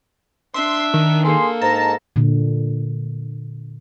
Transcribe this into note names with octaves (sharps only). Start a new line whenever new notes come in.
D4 E5 C6
D#3
A#3 G#4 A4 C6
G#2 A5 A#5
A#2 D3